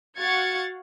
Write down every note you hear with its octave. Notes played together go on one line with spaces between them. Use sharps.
F#4 F5 F#5 G#6 A6 C#7